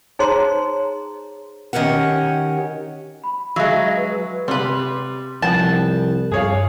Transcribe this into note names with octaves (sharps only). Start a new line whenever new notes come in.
D#4 G#4 C5 C#5 A#5 C6
D#3 C#4 G4 A#4 F#5
B5
F#3 G#3 E5 F5 C#6
B4
C3 G3 B4 C6
C2 F3 B3 G5 A5
G2 G#4 C#5 F5